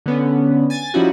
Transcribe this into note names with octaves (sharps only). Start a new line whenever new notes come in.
D3 B3 C#4
G#5 A6
F3 G3 C#4 D#4 E4 F#4